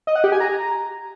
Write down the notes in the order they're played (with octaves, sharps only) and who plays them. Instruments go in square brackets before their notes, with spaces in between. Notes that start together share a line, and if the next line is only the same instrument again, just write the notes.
[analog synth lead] D#5
F#5
G4
G#5
A#5